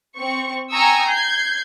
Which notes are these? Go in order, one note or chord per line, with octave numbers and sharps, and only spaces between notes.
C4 C#6
G5 G#5 A#5 C#6 D#6 E6
G6 G#6 C7